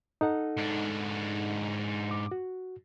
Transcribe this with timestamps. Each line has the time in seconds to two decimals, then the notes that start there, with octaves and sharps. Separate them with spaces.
0.21 D#4 A4 F#5
0.57 G#2 D4
2.11 D6
2.31 F#4